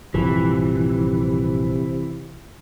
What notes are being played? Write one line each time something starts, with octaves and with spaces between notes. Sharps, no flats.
A#1 G2 C3 E3 F3